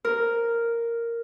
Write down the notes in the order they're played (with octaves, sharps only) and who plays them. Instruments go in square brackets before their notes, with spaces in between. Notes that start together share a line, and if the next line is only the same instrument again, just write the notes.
[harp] A#4